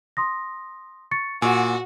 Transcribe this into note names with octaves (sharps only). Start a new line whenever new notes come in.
C6 D#6 A#6
C#6 A6 C#7
A#2 F#4 F#5 G#5 C#6